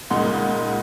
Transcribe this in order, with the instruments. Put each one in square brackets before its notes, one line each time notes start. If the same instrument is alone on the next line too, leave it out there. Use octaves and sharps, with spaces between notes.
[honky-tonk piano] C#2 A#2 G#3 D#4 F#5 C6